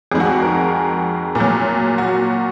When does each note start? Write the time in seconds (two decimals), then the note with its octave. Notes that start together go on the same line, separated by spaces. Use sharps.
0.11 F2 D#3 G#3 G#4
0.20 F#4
0.27 G#4
0.42 A#4
1.35 A#2
1.40 F#3
1.98 F#4